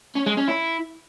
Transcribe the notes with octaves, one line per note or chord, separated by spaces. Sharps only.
C#4
G#3
C#4
E4